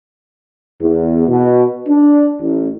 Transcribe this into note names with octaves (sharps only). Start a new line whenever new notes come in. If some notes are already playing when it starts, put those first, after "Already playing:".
E2
B2
D4
A1